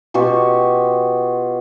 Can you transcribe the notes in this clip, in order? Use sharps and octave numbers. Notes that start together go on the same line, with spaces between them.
B2 F4 G4 C#6